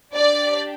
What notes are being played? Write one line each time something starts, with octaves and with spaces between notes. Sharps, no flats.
D4 G4 D5